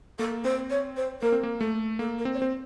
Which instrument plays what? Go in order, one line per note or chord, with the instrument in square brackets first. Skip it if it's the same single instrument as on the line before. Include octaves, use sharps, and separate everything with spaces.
[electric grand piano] A#3 [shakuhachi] A4
[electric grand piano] C4 [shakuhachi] C5
[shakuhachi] C#5
C5
[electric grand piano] A#3 [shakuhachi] A#4
[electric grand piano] C4
A#3
[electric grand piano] A3 [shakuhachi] A4
[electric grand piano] A#3 [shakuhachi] A4
[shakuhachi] A#4
[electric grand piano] C4
[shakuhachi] C#5
C5
[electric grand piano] C4